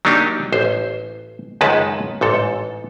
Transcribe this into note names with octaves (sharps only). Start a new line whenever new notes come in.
F#3 A#3 D4 D#4 G4
A1 C5
C#2 F#2 D#3 G#3 B4 A5
A1 G#2 A4